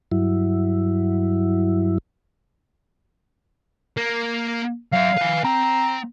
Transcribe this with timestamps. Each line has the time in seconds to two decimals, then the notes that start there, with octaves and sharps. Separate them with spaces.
0.12 G2 F#3 E4
3.97 A#3
4.93 F#3 E5 F5
5.18 B4 G#5
5.44 C4 A#5